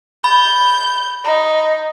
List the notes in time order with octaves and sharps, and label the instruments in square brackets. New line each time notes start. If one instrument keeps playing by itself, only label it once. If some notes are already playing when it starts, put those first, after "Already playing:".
[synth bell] B5 [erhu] G6
[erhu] D#4